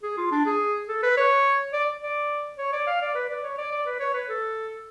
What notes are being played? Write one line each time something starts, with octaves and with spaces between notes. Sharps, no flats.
G#4
F4
D4
G#4
A4
B4
C#5
D5
D5
C#5
D5
F5
D5
B4
D5
C#5
D5
D5
B4
C#5
B4
A4